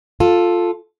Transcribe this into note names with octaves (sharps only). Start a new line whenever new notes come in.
F4 A4